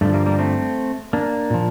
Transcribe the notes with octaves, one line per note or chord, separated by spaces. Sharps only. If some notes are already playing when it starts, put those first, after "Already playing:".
G2 D3 F3 A3
G3 A#3
G3 A#3
A3 C4
A#3 D4
A#2 F3